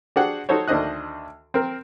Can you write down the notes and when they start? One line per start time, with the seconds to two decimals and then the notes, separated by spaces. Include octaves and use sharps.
0.16 D4 F#4 G#4 C5 F#5 G5
0.49 D#4 F#4 A4 C5 C#5
0.68 D2 D#3 D4 C5 D#5 F#6
1.54 C4 A#4